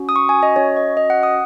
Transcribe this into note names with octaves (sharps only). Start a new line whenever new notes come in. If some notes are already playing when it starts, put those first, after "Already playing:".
Already playing: C#4 F#4
D#6
C#6
G#5
D#5
C#4 F#4 C#5
D#5
D#5
F#5
D#6